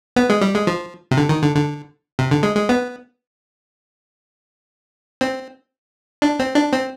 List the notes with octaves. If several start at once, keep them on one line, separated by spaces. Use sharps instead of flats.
B3
G#3
G3
G#3
F3
C3
D3
D#3
D3
D3
C3
D3
G#3
G#3
B3
C4
D4
C4
D4
C4